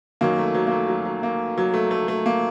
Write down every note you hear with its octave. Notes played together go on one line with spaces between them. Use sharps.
F#2 D#3 F#3 A#3
A3
F#3
A#3
A3
F#3
F#3
A#3
F#3
A3
A3
A3
A#3